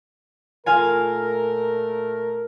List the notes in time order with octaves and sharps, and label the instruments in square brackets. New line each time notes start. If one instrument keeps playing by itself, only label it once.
[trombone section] A#2 A3 A#4 [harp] F4 F5 G#5